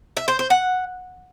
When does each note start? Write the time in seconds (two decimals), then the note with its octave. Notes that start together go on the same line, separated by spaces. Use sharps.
0.17 E5
0.28 C5
0.39 C5
0.50 F#5